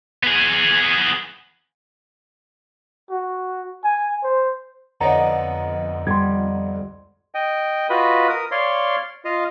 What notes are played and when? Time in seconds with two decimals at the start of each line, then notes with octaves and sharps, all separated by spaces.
0.23 B3 G#4
3.10 F#4
3.84 G#5
4.23 C5
5.01 F2 D3 B3 D#4 C#5 A#5
6.07 G3 C6 G#6
7.35 D#5 G5
7.90 F4 F#4 B4 D#5 B5
8.29 A#4 D#6
8.51 C#5 D5 F5 C6
9.25 F4 D#5 F5